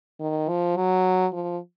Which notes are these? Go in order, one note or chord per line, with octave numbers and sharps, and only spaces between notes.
D#3
F3
F#3
F3